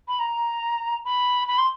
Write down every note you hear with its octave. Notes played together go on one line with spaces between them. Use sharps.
B5
A#5
B5
B5
C6